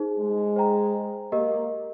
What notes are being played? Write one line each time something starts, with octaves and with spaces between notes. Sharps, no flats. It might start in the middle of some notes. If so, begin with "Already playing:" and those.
Already playing: D#4 G#4 C5
G#3
C5 G5 A#5
A#3 G4 A#4 D#5